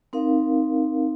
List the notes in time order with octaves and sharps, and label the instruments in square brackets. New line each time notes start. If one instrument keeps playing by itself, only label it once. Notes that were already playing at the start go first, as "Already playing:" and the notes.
[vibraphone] C4 D#4 A#4 F5